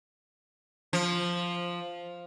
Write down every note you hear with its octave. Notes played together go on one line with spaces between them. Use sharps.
F3